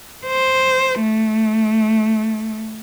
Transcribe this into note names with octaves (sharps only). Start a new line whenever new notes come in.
C5
A3